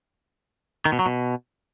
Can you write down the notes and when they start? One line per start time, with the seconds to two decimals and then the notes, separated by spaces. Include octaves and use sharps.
0.86 D#3
0.92 B2
0.99 F#3
1.06 B2